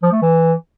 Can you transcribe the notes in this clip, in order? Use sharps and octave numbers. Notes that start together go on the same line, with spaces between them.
F3
A3
E3